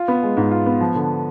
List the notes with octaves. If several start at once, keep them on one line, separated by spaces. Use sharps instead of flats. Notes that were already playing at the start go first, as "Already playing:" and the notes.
Already playing: F4
B3
G#3
G#2
F4
B3
F3
D3